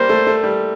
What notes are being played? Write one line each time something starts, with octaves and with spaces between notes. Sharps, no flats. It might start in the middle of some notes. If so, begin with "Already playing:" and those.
Already playing: G3 A#3 C5
A3
A3
G3